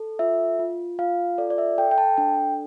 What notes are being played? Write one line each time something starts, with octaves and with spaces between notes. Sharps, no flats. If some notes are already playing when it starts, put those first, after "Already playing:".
Already playing: A4
F4 E5
F4
F4 F5
A4 D5
D5
E5
A4 G5
G5
A5
D4 G5